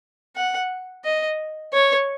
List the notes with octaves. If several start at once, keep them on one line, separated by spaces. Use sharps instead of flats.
F#5
D#5
C#5